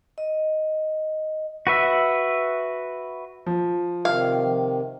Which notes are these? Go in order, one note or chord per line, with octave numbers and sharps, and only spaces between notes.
D#5
F#4 B4 E5
F3
C3 D#3 F5